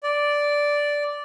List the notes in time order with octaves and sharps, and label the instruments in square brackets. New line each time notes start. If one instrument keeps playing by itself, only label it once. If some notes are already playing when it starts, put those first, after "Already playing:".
[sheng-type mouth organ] D5